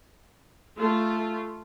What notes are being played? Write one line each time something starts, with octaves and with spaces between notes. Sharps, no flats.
A3 F4